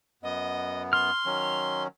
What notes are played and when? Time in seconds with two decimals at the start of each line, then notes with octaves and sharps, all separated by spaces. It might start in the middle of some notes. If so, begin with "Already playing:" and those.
0.23 F#2 B3 D#5
0.93 C6 F6
1.26 D#3 F#3 C#4